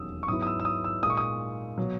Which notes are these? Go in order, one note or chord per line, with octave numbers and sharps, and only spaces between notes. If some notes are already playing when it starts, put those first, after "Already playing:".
Already playing: E1 D#2 D#3 F#3 C#4 D#6 E6
C#6
G#2 F#3 B3 E4 D#6
D#6
E6
E6
D#6
E6
A#2 G#3 D#4 D#6
C#6
D#6
B2 F#3